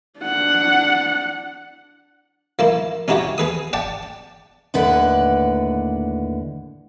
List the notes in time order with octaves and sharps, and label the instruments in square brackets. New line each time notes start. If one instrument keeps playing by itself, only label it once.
[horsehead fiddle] D4 F#5
[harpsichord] F3 A#3 E4
C#4 D#4 E4 F#4 G4 C#5
G#4 B4 D#6
D5 F#5 G5 A5
[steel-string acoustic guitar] D#2 A2 D3 B4 F#5